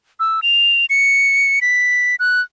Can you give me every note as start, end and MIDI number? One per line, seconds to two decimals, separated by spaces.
0.20 0.40 88
0.43 0.86 101
0.90 1.60 97
1.62 2.15 95
2.20 2.41 90